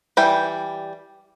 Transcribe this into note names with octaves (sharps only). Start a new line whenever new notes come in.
E3 G3 G5